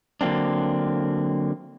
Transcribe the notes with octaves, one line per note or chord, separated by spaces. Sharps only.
D3 F#3 A#3 C4 D4